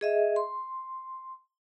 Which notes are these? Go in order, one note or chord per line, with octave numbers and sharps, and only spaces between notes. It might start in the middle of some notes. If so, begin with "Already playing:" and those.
G#4 D#5 E5
C6